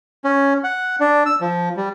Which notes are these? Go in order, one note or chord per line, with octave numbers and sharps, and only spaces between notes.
C#4
F#5
D4
E6
F3
G3